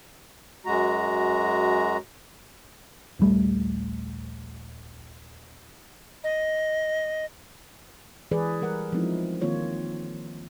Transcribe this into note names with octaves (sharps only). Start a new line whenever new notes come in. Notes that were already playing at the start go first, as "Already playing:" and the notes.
F#2 G#3 F#4 A#5
D#1 A#1 G3 A3
D#5
E3 G#3 G#4 B4 D5
E3 G3 A#4 F#5
F3 G#3 B3 C4 D#4 E4
D#3 A#3 C4 F4 C#5